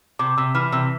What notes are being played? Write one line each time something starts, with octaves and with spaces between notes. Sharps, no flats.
C3 D6
C3 E6
E3 F6
C3 E6